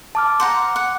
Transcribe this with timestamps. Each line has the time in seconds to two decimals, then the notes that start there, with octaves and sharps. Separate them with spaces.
0.15 A5 D6 F6
0.40 C5 F#5 A#5 D6
0.76 F#5